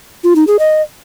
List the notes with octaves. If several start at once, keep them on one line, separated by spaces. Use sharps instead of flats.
F4
D#4
G#4
D#5